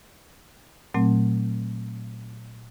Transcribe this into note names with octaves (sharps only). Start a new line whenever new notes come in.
A#2 F#3 A3 C4